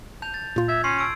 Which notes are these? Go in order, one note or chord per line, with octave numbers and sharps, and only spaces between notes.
A5 G6 F7
A6
A#2 F4
E5 G#6
C#4 C6 C#6 C7
A5 E6 D7